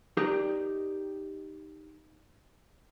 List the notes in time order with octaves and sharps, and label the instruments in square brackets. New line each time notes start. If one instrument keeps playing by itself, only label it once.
[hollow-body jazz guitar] D#4 G4 A#4 D5